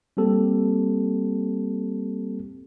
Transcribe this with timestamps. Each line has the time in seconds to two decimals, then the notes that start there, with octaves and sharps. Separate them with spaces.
0.17 G3 A#3 C4 G4 A4